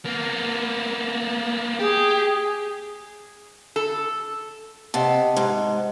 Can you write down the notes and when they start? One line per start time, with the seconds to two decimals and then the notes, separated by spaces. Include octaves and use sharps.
0.05 A#3 B3
1.79 G4 G#4
3.76 A4
4.94 C3 D#5 F#5 A5
5.37 G#2